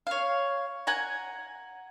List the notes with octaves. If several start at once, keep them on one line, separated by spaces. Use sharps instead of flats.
C#5 F5
F#5 G#5 A#5